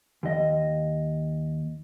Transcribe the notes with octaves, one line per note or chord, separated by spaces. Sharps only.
D#2 D#5